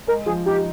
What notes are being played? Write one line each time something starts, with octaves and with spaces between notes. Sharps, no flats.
G#3 A#4
F3 G#4
D#4 G4